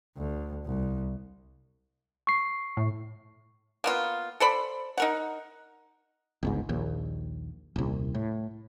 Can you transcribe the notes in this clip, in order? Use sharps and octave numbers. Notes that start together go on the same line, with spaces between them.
D2
C2
C#6 C7
A2
A#3 B3 F4
A4 C5 D5 B5
D#4 A#4 F#5
G1 C#2 G#2
A#1 D#2
D#1 C2
A2